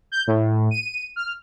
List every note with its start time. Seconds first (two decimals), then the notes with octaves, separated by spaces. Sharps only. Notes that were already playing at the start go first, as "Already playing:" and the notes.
0.12 G6
0.27 A2
0.71 D#7
1.16 F6